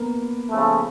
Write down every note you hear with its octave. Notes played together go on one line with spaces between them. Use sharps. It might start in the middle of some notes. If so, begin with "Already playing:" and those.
Already playing: A#3 B3
C#3 F3 A3